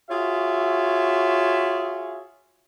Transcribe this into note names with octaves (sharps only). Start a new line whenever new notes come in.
F4 F#4 G#4 C#5 E5